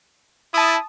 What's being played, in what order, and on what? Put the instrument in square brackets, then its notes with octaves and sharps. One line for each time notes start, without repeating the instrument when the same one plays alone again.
[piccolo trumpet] E4 [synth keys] A5 D#6